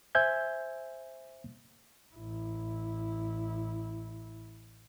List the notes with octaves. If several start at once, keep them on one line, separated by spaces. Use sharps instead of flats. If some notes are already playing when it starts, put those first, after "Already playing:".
C5 E5 G#5 G6 G#6
A1 E4